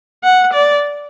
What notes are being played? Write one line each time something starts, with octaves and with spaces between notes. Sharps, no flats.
F#5
D5